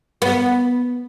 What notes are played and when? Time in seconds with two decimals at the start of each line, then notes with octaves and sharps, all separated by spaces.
0.22 B3